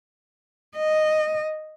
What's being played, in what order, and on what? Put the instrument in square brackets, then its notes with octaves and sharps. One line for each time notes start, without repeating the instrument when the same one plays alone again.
[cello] D#5